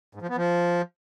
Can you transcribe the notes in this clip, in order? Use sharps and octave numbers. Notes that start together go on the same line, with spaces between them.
G#2
F3
B3
F3